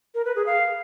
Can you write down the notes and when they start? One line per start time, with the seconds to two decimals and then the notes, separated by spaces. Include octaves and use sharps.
0.15 A#4
0.25 B4
0.36 G#4
0.46 F5